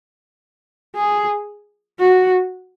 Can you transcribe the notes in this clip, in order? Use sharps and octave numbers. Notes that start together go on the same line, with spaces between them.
G#4
F#4